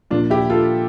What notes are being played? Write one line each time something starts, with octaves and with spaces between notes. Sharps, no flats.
A#2 F3 A#3 D4 F4
E4 G4
F4 A4